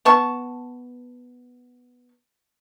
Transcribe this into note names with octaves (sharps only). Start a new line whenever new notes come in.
B3 A5 C#6